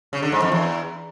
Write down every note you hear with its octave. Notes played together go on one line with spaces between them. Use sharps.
C#3
D3
G#2
F2
E2